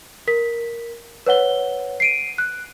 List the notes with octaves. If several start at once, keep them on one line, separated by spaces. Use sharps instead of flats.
A#4 B6
B4 C#5 F#5 G7
C7 D7 D#7
F#6